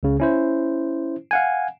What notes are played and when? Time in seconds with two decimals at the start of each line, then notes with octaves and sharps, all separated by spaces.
0.03 C#2 C#3
0.20 C#4 E4 C5
1.31 F5 F#5 G#5